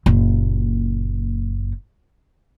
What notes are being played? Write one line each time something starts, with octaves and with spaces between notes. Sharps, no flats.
F#1 A#2